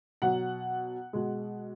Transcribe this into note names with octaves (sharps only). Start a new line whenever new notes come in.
B2 F#3 F#5
B2 G#3